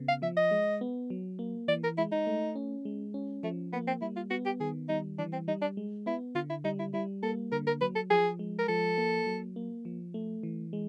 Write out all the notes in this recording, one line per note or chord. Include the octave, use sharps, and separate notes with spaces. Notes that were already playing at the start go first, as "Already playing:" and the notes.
Already playing: C#3 B3
F5
F3 E5
D#5
G#3
B3
F#3
A#3
E3 D5
A#4
G#3 E4
D#4
A3
C#4
G#3
C#4
F3 A3
A#3 B3
C4
G3 E4
F4
B3 F#4
G4
D#3 G#4
G3 D#4
E3 D4
C4
G3 D#4
D4
G#3
B3 E4
D3 F4
E4
G3 D#4
E4
G3 E4
A#3 A4
D3 A#4
A#4
F#3 B4
A4
F3 G#4
G#3
A#4
F3 A4
A#3
F#3
A#3
F3
A3
E3
G#3